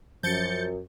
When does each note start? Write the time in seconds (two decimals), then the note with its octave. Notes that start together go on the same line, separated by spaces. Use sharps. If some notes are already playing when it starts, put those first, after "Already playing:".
0.23 F#2 F3 G6 A6 C#7